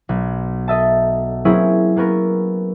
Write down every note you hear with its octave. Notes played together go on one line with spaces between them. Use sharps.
B1
A4 D#5 E5 A5
F#3 A#3 C4 C#4 E4 G#4
A#3 B3 C#4 A#4